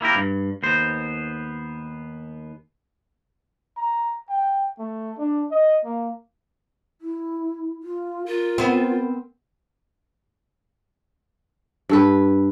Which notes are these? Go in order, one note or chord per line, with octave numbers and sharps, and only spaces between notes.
A#3 E4 G4 A#4
G2
D#2 B3 C5
A#5
G5
A3
D4
D#5
A#3
E4
F4
F4 A#4
B3 C4
G2 A4 B4